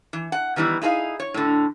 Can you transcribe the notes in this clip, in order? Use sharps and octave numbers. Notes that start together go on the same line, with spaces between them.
E3
F#5
D#3 E3 G3 B3 E4
D#4 E4 G#4 A4 F5
C#5
A2 D3